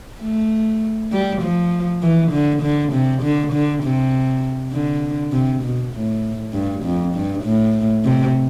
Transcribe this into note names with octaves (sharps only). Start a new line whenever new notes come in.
A3
G3
F3
E3
D3
D3
C3
D3
D3
C3
D3
C3
B2
A2
G2
F2
G2
A2
C3